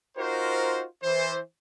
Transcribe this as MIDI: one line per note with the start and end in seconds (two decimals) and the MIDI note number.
0.17 0.83 63
0.17 0.83 65
0.17 0.83 66
0.17 0.83 70
0.17 0.83 72
1.03 1.38 52
1.03 1.38 72